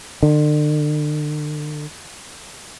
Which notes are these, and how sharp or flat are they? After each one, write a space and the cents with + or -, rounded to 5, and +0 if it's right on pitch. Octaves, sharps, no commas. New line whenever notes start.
D3 +40